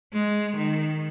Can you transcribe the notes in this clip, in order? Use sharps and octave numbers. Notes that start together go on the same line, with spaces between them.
G#3
D#3